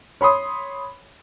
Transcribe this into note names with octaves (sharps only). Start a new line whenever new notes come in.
C#5 B5 C6 D#6